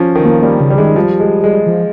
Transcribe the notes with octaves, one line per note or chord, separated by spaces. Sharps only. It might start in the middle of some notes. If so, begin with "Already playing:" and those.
Already playing: F3 C#4
D#3
F3 A#3
G3 A#3
C#3
G3
D#3 G#3
F3 G3
G#3
G#3
F3